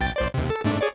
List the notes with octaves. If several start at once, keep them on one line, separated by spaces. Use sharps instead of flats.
B1 G5 A6
A#1 C5 D5
D#2 C3
A4
G#2 A3 D4
G#4 C#5 D5